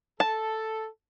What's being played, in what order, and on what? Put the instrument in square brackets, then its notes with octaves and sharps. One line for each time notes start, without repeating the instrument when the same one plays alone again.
[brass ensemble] A4 [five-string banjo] A5